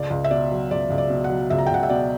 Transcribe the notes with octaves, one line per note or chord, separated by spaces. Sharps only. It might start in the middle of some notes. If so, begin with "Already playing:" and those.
Already playing: C#2 D5
C#2
E5
B2 D5
F#3
C#2 D5
C#2
D5
B2
F#5
F#3
C#2 E5
A#5
G5
C#2 F#5
E5
B2 D5